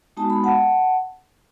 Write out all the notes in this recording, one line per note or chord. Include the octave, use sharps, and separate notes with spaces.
G#3 B3 D#4 F#4 A5
B5
F#5 A5